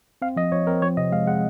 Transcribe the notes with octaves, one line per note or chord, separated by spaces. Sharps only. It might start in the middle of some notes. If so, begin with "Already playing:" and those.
C4 F5
F3 D#5
F3 C#5
C4 A#4
F3 C#5
C3 D#5
G#3 F5
G#3 F#5